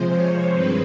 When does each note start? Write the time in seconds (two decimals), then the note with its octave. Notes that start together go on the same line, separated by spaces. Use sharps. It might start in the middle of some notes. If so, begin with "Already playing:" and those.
Already playing: C3 F3 G#3 C5
0.13 C#5
0.53 G2 D#3 G#3 C4 B4